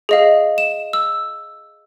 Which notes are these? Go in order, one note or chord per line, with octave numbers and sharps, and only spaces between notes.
G#4 D#5 F5
E7
E6